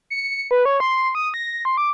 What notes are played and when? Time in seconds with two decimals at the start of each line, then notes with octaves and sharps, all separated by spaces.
0.10 C#7
0.51 B4
0.65 C#5
0.80 C6
1.15 D#6
1.34 A#6
1.65 C6
1.78 D6